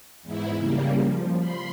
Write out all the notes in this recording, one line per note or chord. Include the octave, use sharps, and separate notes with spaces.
E2 G#2 E4
C#3 G3 A#3
F3
B5 C6